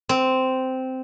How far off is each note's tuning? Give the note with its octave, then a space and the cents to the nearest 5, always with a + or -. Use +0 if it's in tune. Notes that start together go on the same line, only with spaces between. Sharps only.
C4 -10